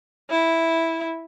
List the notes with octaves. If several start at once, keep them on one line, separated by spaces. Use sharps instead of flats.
E4